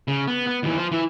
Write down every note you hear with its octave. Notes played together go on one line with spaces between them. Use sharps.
C#3
B3
B3
D#2 E3
F4 C5
E3 E4